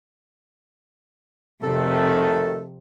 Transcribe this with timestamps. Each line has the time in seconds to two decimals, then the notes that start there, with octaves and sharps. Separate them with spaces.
1.62 G#1 F2 C3 D#3 A3 A4